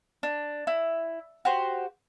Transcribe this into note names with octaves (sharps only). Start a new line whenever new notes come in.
D4
E4
F#4 G4 C5